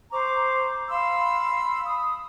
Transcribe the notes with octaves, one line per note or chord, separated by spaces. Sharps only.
C5 A#5 C#6 D6
F5 B5 C6 E6
B5 D#6